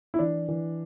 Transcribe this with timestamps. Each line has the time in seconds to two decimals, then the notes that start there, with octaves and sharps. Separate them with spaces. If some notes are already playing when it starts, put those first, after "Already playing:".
0.14 E4
0.19 E3 D4
0.49 E3